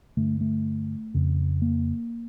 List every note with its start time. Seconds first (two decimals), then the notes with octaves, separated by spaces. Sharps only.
0.17 G2 D3 A3
0.41 A3
1.14 F2 C#3
1.62 A#3